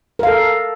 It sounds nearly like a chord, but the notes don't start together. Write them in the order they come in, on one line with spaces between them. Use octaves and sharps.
A#4 F5 A4